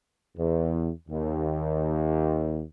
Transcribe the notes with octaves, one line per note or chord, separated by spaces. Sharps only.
E2
D#2